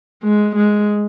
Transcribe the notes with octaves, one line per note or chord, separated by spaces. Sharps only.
G#3
G#3